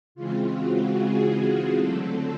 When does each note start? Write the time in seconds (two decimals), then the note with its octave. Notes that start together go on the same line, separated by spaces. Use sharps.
0.15 C#3 E3 G#3 C4 F4
0.55 F#4
0.96 G#4
1.75 D3 F#3 A3 C4 A4